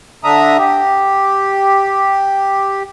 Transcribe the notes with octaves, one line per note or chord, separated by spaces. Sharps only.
D3 D4 E5 A#5 D#6
G4